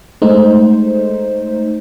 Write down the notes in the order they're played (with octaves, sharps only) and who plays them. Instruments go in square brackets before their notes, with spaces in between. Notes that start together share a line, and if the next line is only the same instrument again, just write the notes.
[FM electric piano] G#3 A3 D#4 C5